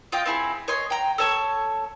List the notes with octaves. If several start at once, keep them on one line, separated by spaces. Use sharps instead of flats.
F4 D#5 G5
C4 E4 G#4
C#5 D#5 C6
G5 A#5
A4 C#5 A5 C#6